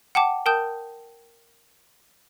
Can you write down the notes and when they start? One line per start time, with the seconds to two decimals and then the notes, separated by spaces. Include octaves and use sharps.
0.15 F#5 G5 A5 D6
0.46 A#4 G5 A5 D#6 G6